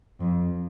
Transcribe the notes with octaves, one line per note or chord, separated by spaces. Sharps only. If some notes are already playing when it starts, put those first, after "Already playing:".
F2